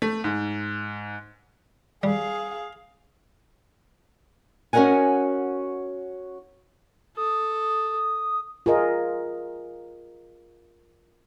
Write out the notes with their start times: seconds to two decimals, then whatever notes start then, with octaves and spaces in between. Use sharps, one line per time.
0.02 A3
0.24 G#2
2.03 G3 G#4 F5
4.73 C#4 F#4 A#4 D#5 F#5 G#5
7.17 A4 D#6
8.66 F4 G#4 A#4 D#5